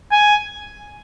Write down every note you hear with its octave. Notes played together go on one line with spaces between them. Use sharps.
G#5